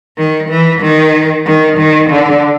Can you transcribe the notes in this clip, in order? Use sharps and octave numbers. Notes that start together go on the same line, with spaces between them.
D#3
E3
D#3
D#3
D#3
D3